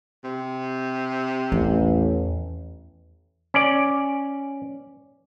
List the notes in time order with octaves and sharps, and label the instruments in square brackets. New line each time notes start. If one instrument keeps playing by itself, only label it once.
[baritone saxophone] C3
[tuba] A1 [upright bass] E2
[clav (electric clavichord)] C#4 D5